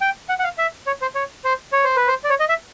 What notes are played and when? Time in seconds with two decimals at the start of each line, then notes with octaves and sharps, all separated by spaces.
0.01 G5
0.29 F#5
0.39 F#5
0.44 F5
0.58 E5
0.87 C#5
1.02 C5
1.15 C#5
1.45 C5
1.73 C#5
1.84 C5
1.96 B4
2.08 C5
2.24 D5
2.29 C#5
2.40 D#5
2.49 E5